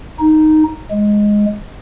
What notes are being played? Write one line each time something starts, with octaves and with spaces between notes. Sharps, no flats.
D#4
G#3